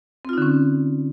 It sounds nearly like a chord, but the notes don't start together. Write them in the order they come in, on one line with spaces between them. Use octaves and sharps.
C4 F4 D#4 D3 C#4